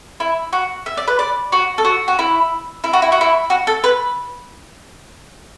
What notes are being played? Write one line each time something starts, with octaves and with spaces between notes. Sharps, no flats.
E4
F#4
E5
D5
B4
D5
F#4
A4
F#4
F#4
E4
E4
F#4
E4
F#4
E4
F#4
A4
B4